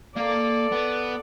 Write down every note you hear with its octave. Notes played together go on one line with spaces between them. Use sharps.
A#3 A4 D5 F5
B3